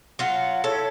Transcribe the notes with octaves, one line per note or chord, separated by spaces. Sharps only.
F#3 F4 F#5
E4 A4 C#5